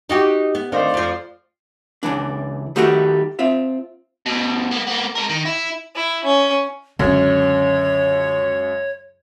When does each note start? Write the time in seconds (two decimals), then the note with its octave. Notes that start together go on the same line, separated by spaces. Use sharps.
0.09 D#4 F#4 G4
0.55 B3
0.72 D2 D#3 C4 C5 D5 F5
0.94 F2 F3
2.03 C#2 E3 D4
2.76 D#3 G3 A3 D#4 F#4 G4
3.39 C4 F4 E5
4.26 D2 B2
4.71 A#3 B3
4.87 A#3 B3
5.15 G#3 A#4
5.29 D#3
5.45 E4
5.95 E4
6.24 C#4
6.99 C#2 F#2 D3 C#4 C#5